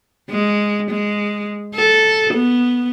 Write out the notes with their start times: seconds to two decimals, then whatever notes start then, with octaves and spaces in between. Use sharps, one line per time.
0.30 G#3
0.91 G#3
1.75 A4
2.34 B3